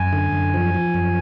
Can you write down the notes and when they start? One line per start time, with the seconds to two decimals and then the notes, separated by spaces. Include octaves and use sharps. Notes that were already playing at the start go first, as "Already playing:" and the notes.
Already playing: F#2 G#5
0.13 D3
0.33 F#2
0.54 F3
0.75 F3
0.94 F#2